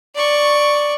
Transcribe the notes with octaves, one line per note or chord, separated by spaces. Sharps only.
D5 C#6